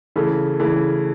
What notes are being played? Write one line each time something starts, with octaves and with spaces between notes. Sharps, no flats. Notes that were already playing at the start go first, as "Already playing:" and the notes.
C#3 E3 A3
C#3 E3 A3